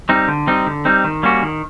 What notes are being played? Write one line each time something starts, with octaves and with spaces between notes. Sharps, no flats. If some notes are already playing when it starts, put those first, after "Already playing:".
G3 C4 D#4
D3
G3 C4 D#4
D3
G3 C4 D#4
D#3
G3 A#3 C#4 F#4
D#3